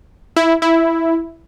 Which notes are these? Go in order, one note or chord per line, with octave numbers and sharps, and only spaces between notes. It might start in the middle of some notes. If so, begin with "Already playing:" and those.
E4
E4